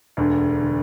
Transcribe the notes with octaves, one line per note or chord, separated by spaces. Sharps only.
E1 D2 D3
D3